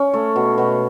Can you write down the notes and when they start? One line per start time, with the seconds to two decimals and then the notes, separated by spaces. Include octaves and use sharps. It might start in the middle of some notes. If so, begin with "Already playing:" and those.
Already playing: C#4
0.14 A3
0.36 B2
0.58 B2